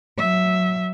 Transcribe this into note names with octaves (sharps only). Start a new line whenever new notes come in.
F#3 E5